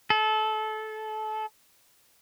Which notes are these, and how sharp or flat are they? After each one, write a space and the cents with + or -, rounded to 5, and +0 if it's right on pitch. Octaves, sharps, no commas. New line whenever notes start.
A4 -25